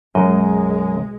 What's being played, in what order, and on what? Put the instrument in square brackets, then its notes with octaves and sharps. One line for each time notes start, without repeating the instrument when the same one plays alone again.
[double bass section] B1 G#3 [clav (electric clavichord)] F#2 D#5